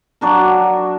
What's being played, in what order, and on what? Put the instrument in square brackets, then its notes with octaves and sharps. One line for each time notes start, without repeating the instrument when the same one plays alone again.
[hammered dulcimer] F#3 D4 A#4